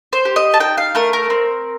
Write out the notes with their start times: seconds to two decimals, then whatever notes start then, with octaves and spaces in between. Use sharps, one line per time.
0.13 C5
0.25 G4
0.36 D#5
0.54 A5
0.60 D#4 G5
0.78 F5
0.95 A3 A#4
1.13 A#4
1.30 C4